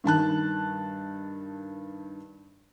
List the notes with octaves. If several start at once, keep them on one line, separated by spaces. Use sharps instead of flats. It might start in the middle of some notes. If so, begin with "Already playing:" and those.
G2 D#3 A5 F#6